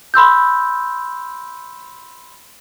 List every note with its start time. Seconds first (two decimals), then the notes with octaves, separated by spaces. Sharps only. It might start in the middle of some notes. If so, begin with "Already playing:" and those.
0.14 B5 C6 E6 G6